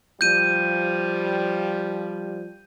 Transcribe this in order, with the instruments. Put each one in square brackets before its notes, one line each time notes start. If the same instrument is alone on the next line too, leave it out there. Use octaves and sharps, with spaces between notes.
[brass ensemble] F3 G3 [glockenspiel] G6 D#7